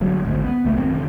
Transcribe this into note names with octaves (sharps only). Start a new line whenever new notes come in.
G1 G2 F#3
G#1 D2 G#2
B3
C#2 A3 B3
G#1 F2 D#3 C4
F1 A2 D3